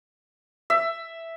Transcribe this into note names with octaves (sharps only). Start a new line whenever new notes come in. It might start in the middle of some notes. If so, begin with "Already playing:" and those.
E5